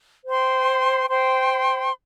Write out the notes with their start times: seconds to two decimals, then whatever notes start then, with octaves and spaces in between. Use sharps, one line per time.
0.25 C5 G5 C6
1.10 C5 G5 C6